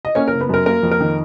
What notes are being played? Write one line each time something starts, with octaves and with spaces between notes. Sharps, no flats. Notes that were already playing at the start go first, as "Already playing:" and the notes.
D#5
A#3 C#4 C#5
F#1 A#4
B3 B4
F#2 A#4
A#3 A#4
F2
A#4
D#3